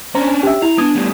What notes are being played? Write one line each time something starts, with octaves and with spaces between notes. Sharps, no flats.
C#4 D4 C5 A#5
G4 E5
E4 A#5
B3 D4 D#6 G#6
A2 G3